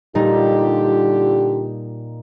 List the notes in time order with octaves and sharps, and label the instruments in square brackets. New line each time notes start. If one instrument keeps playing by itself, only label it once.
[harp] A#2 G3 D#4 [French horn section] D3 F4 G4